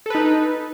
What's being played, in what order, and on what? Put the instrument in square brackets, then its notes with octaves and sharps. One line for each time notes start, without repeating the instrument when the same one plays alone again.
[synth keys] A4
B4
D#4